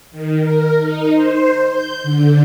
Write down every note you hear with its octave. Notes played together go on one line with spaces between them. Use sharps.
D#3
A#4
D#4
C5
G6
D3